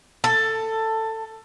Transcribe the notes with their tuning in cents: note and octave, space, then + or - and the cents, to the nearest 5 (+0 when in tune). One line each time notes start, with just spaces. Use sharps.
A4 +15